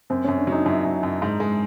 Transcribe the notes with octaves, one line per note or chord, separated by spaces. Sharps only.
F#2 C4
F#2 C#4
D4
F#3 D#4
F#2 E4
F#2
F#2
G#2
G#3